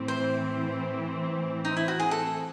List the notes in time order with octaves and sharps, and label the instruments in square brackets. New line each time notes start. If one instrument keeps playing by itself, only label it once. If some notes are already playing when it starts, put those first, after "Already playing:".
Already playing: [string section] A2 E3 C4
[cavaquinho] C5
D#4
E4
F#4
G#4
A4